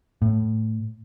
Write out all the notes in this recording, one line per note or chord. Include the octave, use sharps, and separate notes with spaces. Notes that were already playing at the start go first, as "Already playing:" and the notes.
A2